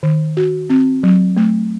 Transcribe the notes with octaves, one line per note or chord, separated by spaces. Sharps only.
D#3
F#4
C4
F#3
A3